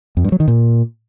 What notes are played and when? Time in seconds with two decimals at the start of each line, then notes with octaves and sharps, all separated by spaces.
0.17 F2
0.24 G2
0.32 F#3
0.40 D#3
0.48 A#2